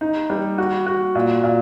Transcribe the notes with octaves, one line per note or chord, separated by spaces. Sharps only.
D#4
G3
F#4
F#4
A#2
A#2